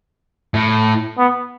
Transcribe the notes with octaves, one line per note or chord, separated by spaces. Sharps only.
A2
B3